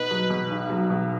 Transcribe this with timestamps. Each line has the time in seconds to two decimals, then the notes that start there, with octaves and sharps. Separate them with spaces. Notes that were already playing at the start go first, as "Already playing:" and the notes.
Already playing: B2 D#4 B4
0.11 F#3
0.30 B2
0.50 B1
0.70 F#3
0.90 B2